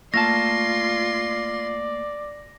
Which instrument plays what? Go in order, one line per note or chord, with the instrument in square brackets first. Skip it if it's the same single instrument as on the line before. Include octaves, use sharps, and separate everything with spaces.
[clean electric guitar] A3 A#3 A5 [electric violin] F4 C6 [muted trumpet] D5 [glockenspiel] A#6